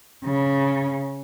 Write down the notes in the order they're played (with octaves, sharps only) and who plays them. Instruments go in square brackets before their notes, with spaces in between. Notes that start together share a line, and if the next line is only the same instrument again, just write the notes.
[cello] C#3